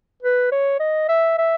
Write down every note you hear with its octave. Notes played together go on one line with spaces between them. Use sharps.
B4
C#5
D#5
E5
E5